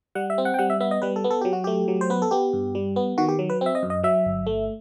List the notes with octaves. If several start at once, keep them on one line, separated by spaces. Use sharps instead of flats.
G3 F#5
E5
C4
F#5
G5
G3 F#5
E5
B3 E5
D#5
G3 B4
A4
B3
A4
F#3 G4
F#4
A3 G4
F#3
C5
B3 B4
A4
B3 G4
G2
G3
B3
D#3 F#4
G4
F#3
B4
C4 E5
D#5
F#2
D#5
F#3 E5
G1
A3